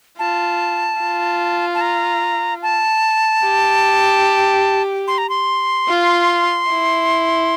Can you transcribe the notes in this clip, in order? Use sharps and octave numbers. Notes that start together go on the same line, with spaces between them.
F4 A5
F4
A5
A#5
A5
G4
C6
A#5
C6
F4
E4